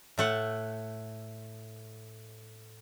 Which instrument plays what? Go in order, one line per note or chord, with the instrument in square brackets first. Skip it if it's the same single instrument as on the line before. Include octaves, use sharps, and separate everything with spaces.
[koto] A2 A3 F#5